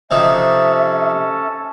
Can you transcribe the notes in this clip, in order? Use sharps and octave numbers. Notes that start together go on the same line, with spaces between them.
C3 F3 C#4 D#4 A4 E5 A5